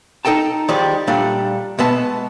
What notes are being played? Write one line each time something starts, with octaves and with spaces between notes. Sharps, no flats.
D#4 A4 D#5 G5 A5
D#3 F3 G3 G#3 D5
A#2 G3 A3 D4
B2 G#3 B3 E5 A5